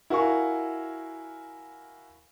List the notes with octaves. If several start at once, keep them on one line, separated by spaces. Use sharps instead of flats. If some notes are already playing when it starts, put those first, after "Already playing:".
E4 F#4 A#4 F5 G#5 C#6